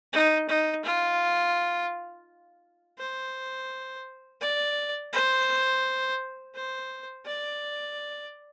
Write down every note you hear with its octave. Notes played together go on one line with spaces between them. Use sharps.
D#4
D#4
F4
C5
D5
C5
C5
D5